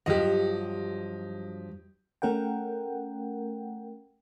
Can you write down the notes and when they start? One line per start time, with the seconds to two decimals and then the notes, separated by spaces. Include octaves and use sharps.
0.06 G2 F3 F#3 G4 D#5
2.22 A3 C#4 A#4 F#5 G5